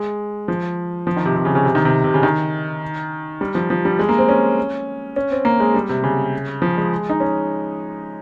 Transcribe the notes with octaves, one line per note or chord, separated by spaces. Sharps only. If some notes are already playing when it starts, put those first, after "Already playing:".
Already playing: G#3
F3
F3
D#3
C3
C3
C#3
C#3
C3
D#3
C3
C3
C#3
D#3
G3
F3
F3
G3
G#3
A#3
C4
C#4
C#4
C4
A#3
G#3
G3
C3
C#3
F3
G#3
D#4
C#4